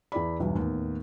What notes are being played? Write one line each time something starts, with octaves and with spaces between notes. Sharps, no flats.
E2 E4 G#4 D5 B5
B1 E2 G2 F#3
D#2 A2 B3